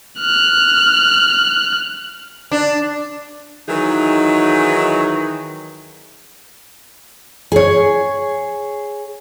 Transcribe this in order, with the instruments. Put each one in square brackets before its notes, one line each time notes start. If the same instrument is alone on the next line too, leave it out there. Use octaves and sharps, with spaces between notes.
[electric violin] F6 F#6
[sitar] D4
[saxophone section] D#3 E3 F#3 D#4 G#4
[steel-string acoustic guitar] G#4 C#5